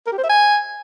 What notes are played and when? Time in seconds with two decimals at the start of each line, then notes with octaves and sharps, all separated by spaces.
0.07 A#4
0.12 G4
0.18 C5
0.24 E5
0.29 G#5